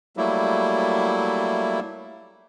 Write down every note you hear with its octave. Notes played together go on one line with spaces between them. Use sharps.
F#3 G3 A3 A#3 E4